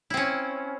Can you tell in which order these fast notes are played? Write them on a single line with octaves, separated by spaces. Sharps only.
E4 C4 C#4